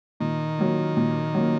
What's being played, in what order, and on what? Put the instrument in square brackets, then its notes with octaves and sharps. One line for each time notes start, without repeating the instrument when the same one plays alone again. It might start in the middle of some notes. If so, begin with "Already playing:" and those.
[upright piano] A#2 [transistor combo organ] D#3
[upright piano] F#3 A#3
A#2
F#3 A#3